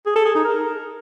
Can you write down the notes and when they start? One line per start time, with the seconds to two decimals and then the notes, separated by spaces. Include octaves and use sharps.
0.06 G#4
0.16 A4
0.25 G#4
0.35 D#4
0.44 A#4